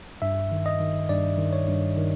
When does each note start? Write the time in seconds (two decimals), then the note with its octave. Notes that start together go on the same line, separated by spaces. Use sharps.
0.22 G2 E5
0.51 D#3
0.66 D#5
0.80 D#3
1.09 G2 D5
1.38 D#3
1.53 C#5
1.68 G2
1.97 D#3